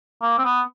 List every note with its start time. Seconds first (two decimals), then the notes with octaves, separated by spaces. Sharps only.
0.22 A#3
0.38 C4
0.45 B3